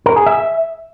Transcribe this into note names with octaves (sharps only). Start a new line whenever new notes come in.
A#4
G#4
E5